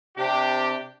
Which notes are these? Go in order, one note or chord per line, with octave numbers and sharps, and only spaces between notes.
C3 D4 G4